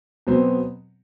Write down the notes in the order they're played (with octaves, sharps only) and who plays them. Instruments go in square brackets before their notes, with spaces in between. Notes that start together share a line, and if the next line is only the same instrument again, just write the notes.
[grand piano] B2 F#3 B3 C4